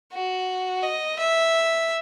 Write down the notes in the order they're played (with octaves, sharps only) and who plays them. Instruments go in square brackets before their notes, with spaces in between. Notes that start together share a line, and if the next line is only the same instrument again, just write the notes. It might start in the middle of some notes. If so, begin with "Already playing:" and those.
[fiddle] F#4
D#5
E5